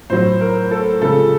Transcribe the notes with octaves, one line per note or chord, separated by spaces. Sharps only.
A2 F#3 C5
A#4
A4
C#3 F3 G#3 A4